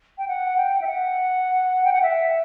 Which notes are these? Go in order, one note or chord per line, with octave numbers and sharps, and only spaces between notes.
G5
F#5
G5
E5
F#5
G5
F#5
E5